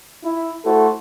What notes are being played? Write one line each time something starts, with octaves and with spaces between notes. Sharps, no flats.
E4
A3 E4 F#4 A4 C5